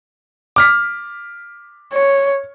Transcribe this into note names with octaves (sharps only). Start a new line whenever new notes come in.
D6 F6 B6
C#5